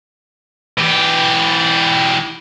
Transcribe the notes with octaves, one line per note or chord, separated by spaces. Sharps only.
E3 G4